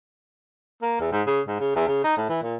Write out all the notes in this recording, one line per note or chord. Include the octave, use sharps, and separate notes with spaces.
A#3
E2
G#2
C#3
G#2
C#3
E2
C#3
D#4
A2
E3
A#2